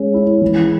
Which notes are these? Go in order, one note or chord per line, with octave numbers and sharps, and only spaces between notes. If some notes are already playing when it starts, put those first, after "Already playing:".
Already playing: G#3 C#4
E4
E3